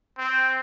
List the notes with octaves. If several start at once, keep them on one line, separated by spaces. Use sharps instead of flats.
C4